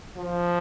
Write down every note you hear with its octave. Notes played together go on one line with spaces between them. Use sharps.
F3